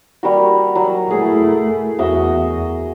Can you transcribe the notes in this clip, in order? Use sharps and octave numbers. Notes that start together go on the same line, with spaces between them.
G3 A#3 F#4
F#3
A3 E4 G#4
E2 F#4 D#5 E5